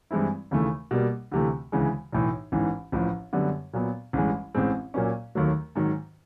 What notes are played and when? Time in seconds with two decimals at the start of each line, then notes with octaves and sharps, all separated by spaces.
0.11 G2 E3 G#3 C4 E4
0.51 D#2 C#3 E3 A3
0.91 B2 G3 A#3
1.31 D2 C3 E3 A3
1.72 D2 C#3 E3 G#3
2.12 B1 A2 E3
2.52 A1 G#2 E3
2.92 A1 A2 F3
3.33 F#2 D3 G3 B3
3.73 A#2 F#3 B3
4.13 A1 G2 E3 G#3
4.54 A1 A2 E3 G#3 C4
4.94 A#2 F#3 A#3 C#4
5.35 D#2 D#3 F#3 A3
5.75 G#2 D#3 F#3